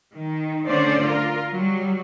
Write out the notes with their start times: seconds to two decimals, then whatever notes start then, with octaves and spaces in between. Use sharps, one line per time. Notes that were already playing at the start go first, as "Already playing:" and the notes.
0.14 D#3
0.66 D3 A3 C#4 C5 D5
1.04 F4 A#4
1.51 F#3 G3